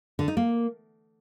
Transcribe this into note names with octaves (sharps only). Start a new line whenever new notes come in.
D3
D#4
A#3